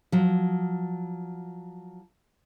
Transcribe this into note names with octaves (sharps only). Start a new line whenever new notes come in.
F3 F#3